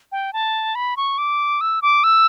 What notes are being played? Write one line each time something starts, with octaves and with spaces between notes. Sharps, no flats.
G5
A5
B5
C#6
D6
E6
D6
E6